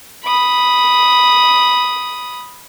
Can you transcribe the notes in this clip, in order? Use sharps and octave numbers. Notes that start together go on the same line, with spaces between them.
B5 D#6